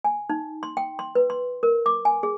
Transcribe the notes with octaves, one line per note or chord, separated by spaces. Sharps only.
G#5
D#4
C6
G5
C6
B4
C6
A#4
D6
G#5
G#4